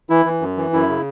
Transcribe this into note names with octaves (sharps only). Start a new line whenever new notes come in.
E3 E4
E3
F#2
E3
F#2 E4
C#3